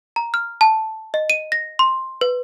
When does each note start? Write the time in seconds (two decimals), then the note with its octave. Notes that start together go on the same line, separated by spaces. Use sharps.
0.16 A#5
0.34 F6
0.61 A5
1.14 D#5
1.30 D#7
1.52 A#6
1.79 C6
2.21 B4